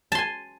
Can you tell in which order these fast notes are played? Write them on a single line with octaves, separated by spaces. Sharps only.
A5 C6 G#5